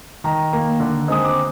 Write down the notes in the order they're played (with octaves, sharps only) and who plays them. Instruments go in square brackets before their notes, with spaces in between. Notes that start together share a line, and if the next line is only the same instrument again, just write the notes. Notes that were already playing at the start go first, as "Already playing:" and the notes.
[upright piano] D#3 A#5
A#3
D3
G#3 C4 D#6
D6